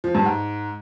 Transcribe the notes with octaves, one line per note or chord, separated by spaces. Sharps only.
F3
G2
G#2